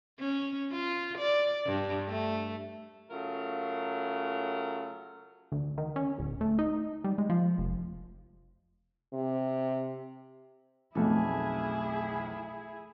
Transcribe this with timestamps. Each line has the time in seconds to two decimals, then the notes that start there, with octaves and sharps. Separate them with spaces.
0.20 C#4
0.72 F4
1.18 D5
1.66 G2
2.08 A3
3.09 C#3 F#3 A3 F4 A#4
5.52 D2
5.78 D#3
5.96 C#4
6.18 D1
6.41 A3
6.59 D#4
7.04 G3
7.18 G#3
7.30 F3
7.58 F1
9.14 C3
10.95 B1 F2 A3 E4 G#4